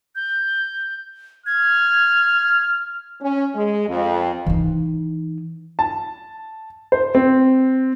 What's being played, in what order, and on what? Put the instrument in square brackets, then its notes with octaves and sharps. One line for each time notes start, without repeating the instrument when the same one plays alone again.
[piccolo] G6
[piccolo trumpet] F6 [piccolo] G#6
[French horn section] C#4
G#3
F2
[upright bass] E3 D#4
[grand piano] A5
C5
C4